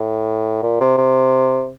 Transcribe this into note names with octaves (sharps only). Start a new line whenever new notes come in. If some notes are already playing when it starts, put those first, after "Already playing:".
Already playing: A2
A#2
C3
C3